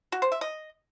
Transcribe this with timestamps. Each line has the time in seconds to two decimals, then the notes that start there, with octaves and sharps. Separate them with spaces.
0.12 F#4
0.22 C5
0.32 E5
0.41 D#5